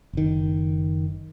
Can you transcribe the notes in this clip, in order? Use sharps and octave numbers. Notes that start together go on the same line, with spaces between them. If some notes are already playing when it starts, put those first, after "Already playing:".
F#1 D#3